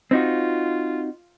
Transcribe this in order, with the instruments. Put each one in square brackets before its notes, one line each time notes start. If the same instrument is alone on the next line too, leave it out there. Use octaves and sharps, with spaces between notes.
[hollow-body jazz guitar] C4 D#4 F#4 [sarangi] F4